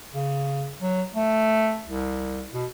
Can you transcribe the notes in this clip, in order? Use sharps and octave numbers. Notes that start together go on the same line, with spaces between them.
C#3
F#3
A3
C2
B2